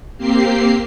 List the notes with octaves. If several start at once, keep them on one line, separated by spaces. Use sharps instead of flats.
A#3 C4 G4 C7